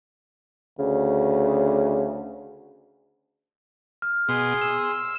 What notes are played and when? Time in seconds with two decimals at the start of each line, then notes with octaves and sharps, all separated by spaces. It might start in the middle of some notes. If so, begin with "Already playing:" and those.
0.79 D2 C#3
4.02 F6
4.29 B2 G#4 C6
4.61 E6